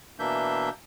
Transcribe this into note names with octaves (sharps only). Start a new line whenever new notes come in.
B2 E3 A#3 D4 E5 G6